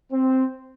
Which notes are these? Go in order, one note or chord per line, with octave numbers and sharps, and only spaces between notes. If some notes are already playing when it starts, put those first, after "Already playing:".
C4